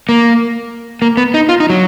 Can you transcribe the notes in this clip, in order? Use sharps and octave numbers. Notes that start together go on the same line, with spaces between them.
A#3
A#3
B3
D#4
F4
D#4
F#3